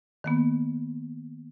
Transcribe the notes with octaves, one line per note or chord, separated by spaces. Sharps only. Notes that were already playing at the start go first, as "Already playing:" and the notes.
D#3 A#3 B3